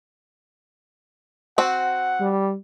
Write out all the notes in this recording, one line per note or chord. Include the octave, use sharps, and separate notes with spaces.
C4 F#4 F#5
G3